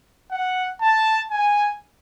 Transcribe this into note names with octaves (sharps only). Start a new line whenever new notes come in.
F#5
A5
G#5